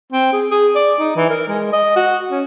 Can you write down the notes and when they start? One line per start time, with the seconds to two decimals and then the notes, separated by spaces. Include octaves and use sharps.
0.12 C4
0.33 G#4
0.51 G#4
0.75 D5
0.99 D#4
1.16 E3
1.30 A#4
1.48 G#3
1.72 D#5
1.96 F#4
2.31 C#4